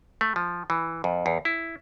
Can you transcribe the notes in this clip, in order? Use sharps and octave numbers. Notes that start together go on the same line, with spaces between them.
A3
F3
E3
F2
E2
E4